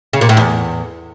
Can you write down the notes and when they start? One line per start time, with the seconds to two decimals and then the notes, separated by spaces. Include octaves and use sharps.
0.13 C#3
0.21 A#2
0.29 A2
0.37 E2